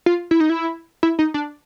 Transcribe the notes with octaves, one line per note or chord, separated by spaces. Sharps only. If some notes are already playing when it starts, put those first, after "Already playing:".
F4
E4
D#4
E4
E4
D#4
D4